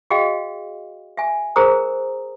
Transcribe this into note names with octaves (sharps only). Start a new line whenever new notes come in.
F#4 G#4 D#5 F5 G5
E5 G#5
G#4 A#4 C5 A#5 D#6